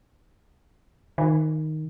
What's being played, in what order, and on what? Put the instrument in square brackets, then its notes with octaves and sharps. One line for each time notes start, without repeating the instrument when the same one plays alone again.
[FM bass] D#3